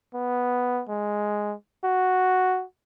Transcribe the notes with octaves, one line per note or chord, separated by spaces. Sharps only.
B3
G#3
F#4